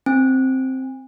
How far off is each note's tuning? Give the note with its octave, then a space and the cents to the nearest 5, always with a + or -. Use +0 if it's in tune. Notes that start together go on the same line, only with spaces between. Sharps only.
C4 +5 G#5 -35